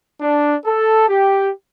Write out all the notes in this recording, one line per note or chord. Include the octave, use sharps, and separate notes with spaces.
D4
A4
G4